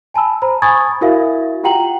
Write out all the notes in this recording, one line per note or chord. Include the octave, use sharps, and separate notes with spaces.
G#5 A5 B5 E6
C5 A#5 B5
G#5 B5 C#6 D#6 G#6 A6
E4 F#4 A#4 E5 F5
F4 G4 F#5 G5 A#5 F#7